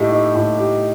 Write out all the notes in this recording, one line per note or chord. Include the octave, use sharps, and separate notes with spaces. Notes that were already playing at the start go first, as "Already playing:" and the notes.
Already playing: A2 A3 D#4 G4
D#4
A2
G4